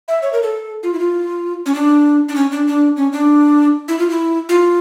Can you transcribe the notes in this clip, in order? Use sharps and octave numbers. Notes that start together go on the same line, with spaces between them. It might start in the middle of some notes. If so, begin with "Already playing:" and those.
E5
C#5
A#4
A4
F4
E4
F4
C#4
D4
D4
C#4
D4
D4
C#4
D4
E4
F4
E4
F4